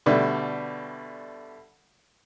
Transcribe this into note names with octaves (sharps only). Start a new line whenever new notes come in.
B2 D3 G3 A3